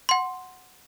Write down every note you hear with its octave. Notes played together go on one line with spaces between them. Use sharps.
F#5 C6